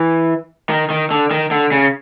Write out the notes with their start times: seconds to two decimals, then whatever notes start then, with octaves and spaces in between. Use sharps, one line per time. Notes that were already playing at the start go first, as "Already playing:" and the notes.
Already playing: E3
0.70 D#3
0.90 D#3
1.11 D3
1.31 D#3
1.51 D3
1.72 C#3